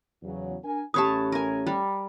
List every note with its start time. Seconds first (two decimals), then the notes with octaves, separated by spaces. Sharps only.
0.22 E2 C#3 F#3
0.63 D4 A#4 G#5
0.94 A1 A3 C#4 G4 B4 C#5 A5 D#6
1.32 A#4 G#5
1.67 G3